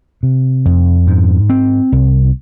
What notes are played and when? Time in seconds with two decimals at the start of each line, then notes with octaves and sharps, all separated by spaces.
0.23 C3
0.65 F2
1.07 G#2
1.49 C4
1.92 C2